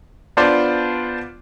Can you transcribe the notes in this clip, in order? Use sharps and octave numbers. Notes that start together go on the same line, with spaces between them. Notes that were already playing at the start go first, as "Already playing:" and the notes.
B3 D4 F4 C5 D5